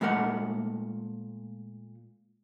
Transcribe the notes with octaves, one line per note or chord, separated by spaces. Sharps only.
A#2 G#3 A3 A#4 F#5